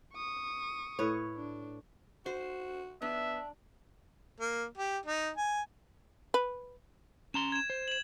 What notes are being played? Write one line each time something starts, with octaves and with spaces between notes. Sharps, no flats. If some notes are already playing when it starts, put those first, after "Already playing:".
C#6 D#6
A2 B4 C#5
D4
F#4 C5
B3 D4 E5
A#3
G4
D#4
G#5
B4
C#4 A#5 C6 E7
G#6 E7
C5
E7 F#7